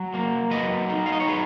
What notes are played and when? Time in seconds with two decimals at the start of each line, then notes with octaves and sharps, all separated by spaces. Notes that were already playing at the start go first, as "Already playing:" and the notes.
Already playing: F#3
0.14 A#3
0.51 F#3 B4 D#5
0.89 D#4
1.06 F5
1.12 D#5
1.20 C#5
1.27 F#3 G#4 B4